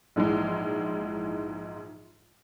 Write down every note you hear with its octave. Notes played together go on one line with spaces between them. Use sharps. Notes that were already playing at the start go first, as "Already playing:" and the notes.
A#1 G#2 E3 G#3